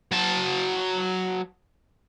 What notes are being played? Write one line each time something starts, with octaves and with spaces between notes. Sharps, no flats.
F#3 A5